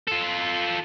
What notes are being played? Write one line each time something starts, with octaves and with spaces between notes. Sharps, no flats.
F4 A4